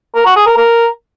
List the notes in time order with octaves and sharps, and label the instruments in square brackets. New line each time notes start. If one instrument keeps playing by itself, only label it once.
[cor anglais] A#4
F#4
G#4
A#4
A#4